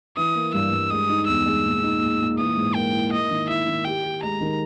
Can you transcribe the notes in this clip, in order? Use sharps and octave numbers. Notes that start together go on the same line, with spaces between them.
E3 D#6
A#3
G2 E6
G2
G#3 D#6
D#4
E2 E6
G#3
A#2
D#4
A#2
A#2
E3 D#6
G#2
A#3 G5
E4
A#3 D#5
D#3
E4 E5
D#3
G4 G5
G4
G#3 A#5
D#3